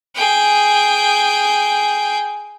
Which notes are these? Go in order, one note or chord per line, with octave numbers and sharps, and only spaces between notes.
G#4 G5